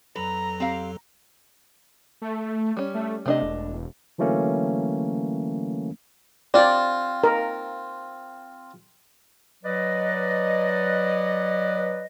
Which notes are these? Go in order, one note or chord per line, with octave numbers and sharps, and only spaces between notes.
F2 F#3 A4 B4 A#5
C4 G4 F5
A3
G3 C#4
A3
C3 A3 D4 D#5
E1
D3 E3 F#3 A3 A#3 C#4
C4 F4 D5
A#4
F#3 B4 D5 D#5